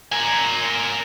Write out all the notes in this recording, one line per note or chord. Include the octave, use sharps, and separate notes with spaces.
A#4 G#5